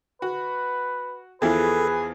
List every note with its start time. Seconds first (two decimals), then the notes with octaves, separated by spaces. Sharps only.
0.22 F#4 B4
1.42 E2 E3 F3 G#4 A4 B4